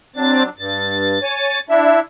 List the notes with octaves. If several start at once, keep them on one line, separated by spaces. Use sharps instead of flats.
F#3 C4 D4 A6
G2 A6
C#5 G#5
D4 E4 E5